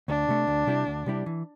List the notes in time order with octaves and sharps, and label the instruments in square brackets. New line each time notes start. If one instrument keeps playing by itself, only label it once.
[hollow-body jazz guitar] D2 [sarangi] D4
[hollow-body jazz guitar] C3 A3
D2
C3 G3 E4 G4
D2
C3 G3 E4 G4
E3